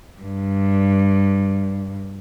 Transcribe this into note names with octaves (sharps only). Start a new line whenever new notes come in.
G2